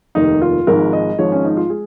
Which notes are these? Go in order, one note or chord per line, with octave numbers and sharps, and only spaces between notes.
F1 D#2 D#3 D#4
F4
G#1 G#2 F3 G#3 A#4
D#5
G#1 G#2 F3 G#3 C#5
C#4
D#4
F4
G#3 G#4